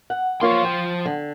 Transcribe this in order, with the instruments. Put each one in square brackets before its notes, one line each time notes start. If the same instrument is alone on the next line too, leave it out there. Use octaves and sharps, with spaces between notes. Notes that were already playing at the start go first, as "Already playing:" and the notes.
[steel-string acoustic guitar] F#5
[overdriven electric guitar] F3 C6 [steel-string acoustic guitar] A#3 F4 C#5
[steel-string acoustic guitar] G5
D3